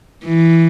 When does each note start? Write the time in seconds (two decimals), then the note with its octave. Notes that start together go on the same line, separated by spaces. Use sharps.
0.25 E3